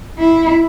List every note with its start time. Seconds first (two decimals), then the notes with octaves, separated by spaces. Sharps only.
0.18 E4